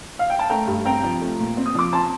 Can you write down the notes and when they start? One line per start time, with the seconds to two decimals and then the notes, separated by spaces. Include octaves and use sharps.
0.19 F5
0.30 G5
0.39 A5
0.50 A3 G5 A#5
0.67 G2
0.85 C4 G5 A#5
1.03 F3
1.21 A3
1.39 A#2
1.57 C4
1.66 D#6
1.75 F3 D6
1.93 C4 A5 C6